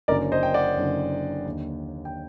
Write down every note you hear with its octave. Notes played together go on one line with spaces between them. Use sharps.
F#1 F#2 D3 A#4 D5
C5 D#5
G5
D5 F#5
F#1 F#2 D3
D#2
D3
G5